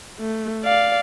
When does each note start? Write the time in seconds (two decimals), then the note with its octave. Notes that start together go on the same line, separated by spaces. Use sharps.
0.20 A3
0.64 D5 F5